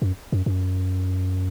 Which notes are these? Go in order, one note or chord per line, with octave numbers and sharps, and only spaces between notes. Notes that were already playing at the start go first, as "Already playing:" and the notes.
F#2
F#2
F#2